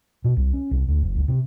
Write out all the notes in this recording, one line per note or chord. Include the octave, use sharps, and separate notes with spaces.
B2
C2
C#4
C2
D2
F#1
C#2
C3